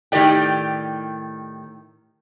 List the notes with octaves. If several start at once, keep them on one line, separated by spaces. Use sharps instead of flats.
A2 D#3 G4 D5 G5